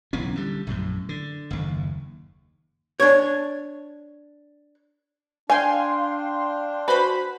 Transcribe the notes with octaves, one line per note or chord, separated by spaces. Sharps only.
D1 B1 E3 C#4
D3 G3
A#1 F#2 A2
D3
F#1 D#2
D4 C#5
D4 F5 G5 G#5 C6
F#4 B4 C5 B5